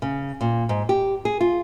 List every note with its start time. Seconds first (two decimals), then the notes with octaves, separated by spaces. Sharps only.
0.02 C#3
0.41 A#2
0.69 G#2
0.89 G4
1.25 G#4
1.40 F4